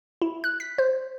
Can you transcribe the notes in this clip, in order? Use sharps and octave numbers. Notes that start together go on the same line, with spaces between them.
E4
F#6
B6
C5